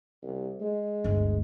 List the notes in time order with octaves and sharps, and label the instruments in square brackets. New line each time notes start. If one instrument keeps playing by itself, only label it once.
[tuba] C2
G#3
[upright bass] G1 D2